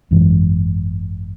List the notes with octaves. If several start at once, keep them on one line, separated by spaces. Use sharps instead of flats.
G#1 F#2 E3 G#3